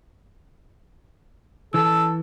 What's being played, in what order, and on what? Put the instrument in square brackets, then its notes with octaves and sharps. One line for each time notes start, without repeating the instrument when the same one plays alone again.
[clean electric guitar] E3 [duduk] A4 [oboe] E6